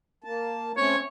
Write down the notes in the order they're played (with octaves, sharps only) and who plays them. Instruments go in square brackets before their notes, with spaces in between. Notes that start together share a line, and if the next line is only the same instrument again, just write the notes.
[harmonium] A#3 A5
[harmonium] A3 C4 C#4 [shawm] C#5